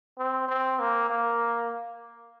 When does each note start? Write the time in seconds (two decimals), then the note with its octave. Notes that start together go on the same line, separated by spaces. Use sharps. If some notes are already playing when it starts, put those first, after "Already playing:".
0.19 C4
0.48 C4
0.80 A#3
1.10 A#3